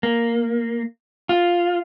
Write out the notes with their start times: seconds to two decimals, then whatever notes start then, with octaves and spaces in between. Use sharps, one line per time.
0.03 A#3
1.29 F4